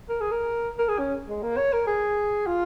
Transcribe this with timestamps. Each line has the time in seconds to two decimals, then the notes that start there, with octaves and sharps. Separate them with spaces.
0.09 A#4
0.21 G#4
0.32 A#4
0.79 A#4
0.88 G#4
0.99 C#4
1.28 G#3
1.43 A#3
1.57 C#5
1.73 A#4
1.87 G#4
2.47 F4